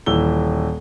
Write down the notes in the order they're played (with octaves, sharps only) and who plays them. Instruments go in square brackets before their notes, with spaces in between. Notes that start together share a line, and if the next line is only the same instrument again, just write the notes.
[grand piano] D#1 E3 E6 G7